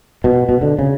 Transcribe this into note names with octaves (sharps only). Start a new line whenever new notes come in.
B2
B2
D3
C#3